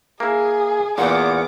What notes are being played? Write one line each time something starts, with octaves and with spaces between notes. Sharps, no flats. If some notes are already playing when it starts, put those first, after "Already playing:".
A#3 E4 G#4
E2 A#2 F#5 D6